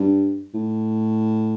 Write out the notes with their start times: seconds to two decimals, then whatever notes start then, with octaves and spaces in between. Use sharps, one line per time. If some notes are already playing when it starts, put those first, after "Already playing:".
Already playing: G2
0.54 A2